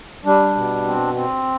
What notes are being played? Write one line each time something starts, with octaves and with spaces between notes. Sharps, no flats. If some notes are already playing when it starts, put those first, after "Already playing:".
G3 D4
B2
C4
C4